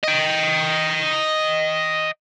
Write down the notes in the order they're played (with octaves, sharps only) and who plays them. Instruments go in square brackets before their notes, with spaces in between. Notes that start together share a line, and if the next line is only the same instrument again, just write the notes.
[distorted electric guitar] D#5 G5